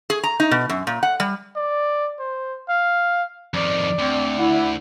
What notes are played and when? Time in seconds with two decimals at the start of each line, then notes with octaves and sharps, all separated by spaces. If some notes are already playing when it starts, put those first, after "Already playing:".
0.10 G#4
0.24 A#5
0.40 D#4
0.51 B2
0.70 F#2
0.87 A#2
1.03 F#5
1.20 G3
1.56 D5
2.19 C5
2.69 F5
3.54 F2 D#3 D5
3.99 D2 C4
4.39 E4 F#5